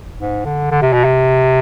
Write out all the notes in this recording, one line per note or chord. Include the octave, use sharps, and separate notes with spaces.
G#2
D3
D3
C3
B2
C3